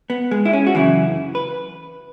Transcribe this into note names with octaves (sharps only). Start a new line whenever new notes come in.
B3
G#3
E4
C#4
F#4
F#2 C#3 E3 E4
B4